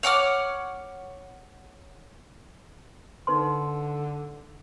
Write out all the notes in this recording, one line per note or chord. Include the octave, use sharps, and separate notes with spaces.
C#5 F#5 D6 F6
D3 D#4 B4 C6